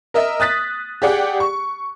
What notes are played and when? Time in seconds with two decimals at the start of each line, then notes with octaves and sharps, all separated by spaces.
0.14 A#4 D#5 E5
0.40 D#6 F#6 A6 B6
1.02 G4 G#4 D5 F#5 G5
1.40 C#6